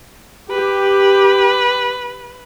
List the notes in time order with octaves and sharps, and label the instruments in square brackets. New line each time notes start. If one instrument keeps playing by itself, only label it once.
[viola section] G4 [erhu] B4